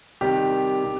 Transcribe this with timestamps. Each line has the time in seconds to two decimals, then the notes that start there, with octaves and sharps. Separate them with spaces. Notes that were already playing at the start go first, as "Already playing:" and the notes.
0.21 C3 D#3 G3 G4
0.84 C3